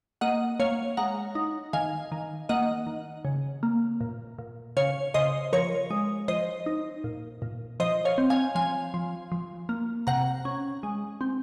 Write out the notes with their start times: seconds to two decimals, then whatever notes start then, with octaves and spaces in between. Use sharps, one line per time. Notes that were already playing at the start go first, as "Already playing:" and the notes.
0.21 A#3 D#5 F#5
0.60 A#3 C#5 F5
0.97 G#3 F#5 A#5
1.35 D#4
1.73 D#3 F5 G#5
2.12 D#3
2.49 A#3 D#5 F#5
2.87 D#3
3.25 C#3
3.63 A#3
4.01 A#2
4.39 A#2
4.77 C#3 C#5 F5
5.14 C#3 C5 D#5
5.53 F3 A#4 C#5
5.90 G#3
6.28 F3 C5 D#5
6.66 D#4
7.04 A#2
7.42 A#2
7.80 F3 C5 D#5
8.05 C#5 F5
8.18 C4
8.30 F5 G#5
8.55 F3 F5 G#5
8.94 F3
9.32 F3
9.69 A#3
10.07 C3 F#5 A#5
10.45 C#4
10.83 G#3
11.21 C4